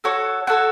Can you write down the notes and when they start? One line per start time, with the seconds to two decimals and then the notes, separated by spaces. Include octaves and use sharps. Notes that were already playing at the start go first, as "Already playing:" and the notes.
0.04 F#4 A4 C#5
0.47 F#4 A4 C#5